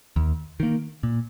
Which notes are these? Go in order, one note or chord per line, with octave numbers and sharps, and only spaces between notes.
D#2
D#3 A#3
A#2